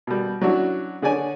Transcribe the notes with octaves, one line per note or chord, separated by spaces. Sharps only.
B2 G3
F#3 C#4 D4 E4 F#4
D3 G#4 C#5 D5 G#5